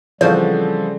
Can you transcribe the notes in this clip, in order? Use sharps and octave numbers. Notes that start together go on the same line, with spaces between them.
C#3 E3 F3 G3 C4 F#4 A4 C5